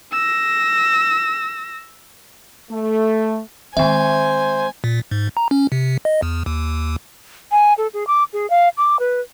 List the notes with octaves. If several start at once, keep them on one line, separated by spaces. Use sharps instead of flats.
E6 A#6
A3
D#3 G#3 C4 C5 E5 G#5
A#2
G#2
A#5
C#4
C3
D#5
E2
D#2
G#5
A4
G#4
D6
G#4
F5
D6
B4